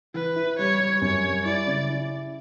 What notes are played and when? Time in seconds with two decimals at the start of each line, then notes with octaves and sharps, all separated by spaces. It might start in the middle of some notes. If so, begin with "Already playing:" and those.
0.14 E3 B4
0.36 E4
0.59 G3 C#5
0.80 G3
1.01 F#2 C#5
1.24 G3
1.45 E4 D5
1.67 C#3
1.89 E4